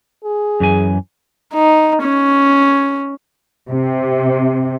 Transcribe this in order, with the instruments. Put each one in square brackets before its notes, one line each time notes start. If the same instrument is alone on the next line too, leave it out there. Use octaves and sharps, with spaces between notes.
[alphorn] G#4
[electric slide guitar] F#2 E3 G#5
[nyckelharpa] D#4
C#4
[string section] C3